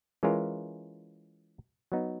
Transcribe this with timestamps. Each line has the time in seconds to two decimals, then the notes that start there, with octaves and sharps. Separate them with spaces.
0.23 E3 G#3 C#4 F4 A#4
1.92 F#3 B3 D#4